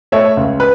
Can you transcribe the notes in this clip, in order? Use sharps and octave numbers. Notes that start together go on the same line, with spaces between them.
A3 C#5 E5
C#2
B4